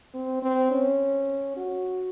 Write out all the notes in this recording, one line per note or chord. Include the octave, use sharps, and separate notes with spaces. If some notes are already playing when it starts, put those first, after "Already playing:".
C4
C4
C#4
F#4